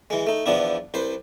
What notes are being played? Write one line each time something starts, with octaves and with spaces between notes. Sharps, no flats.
E3 G#3
A3 D#4
E2 F3 B3 D4 E4
C2 B4 C5